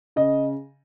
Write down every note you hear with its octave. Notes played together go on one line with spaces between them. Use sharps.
C#3 D#5